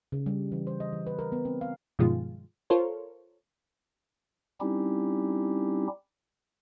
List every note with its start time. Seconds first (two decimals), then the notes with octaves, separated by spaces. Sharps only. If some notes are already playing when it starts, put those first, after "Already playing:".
0.12 C#3
0.26 G3
0.52 E3
0.67 C5
0.80 D#5
0.93 E3
1.07 B4
1.19 A#4
1.32 B3
1.45 C4
1.61 F5
1.99 G2 B2 D#3 F3 G#3 F4
2.70 F4 A4 A#4 C5 C#5
4.61 G3 C4 C#4 D#4 E4 G4